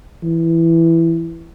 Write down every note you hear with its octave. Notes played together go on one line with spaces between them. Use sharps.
E3